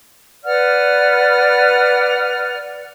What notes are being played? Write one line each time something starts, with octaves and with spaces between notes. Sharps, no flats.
B4 D5 F#5 F6